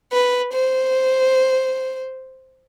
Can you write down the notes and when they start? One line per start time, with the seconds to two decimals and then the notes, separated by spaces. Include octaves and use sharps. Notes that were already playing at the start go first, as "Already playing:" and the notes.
0.12 B4
0.53 C5